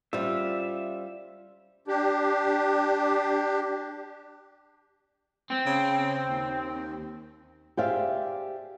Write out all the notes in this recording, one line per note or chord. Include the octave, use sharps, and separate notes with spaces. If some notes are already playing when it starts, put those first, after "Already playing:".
G3 C#4 F4 C5 D5 E5
D4 G4
C4
C#3
D#2
G4 G#4 C5 D5 E5 F5